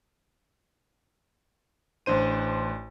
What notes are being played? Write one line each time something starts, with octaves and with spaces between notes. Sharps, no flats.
A1 D4 C5 D#7